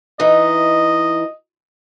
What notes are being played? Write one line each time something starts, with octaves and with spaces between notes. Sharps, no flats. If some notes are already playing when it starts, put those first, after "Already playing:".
E3 D#4 D#5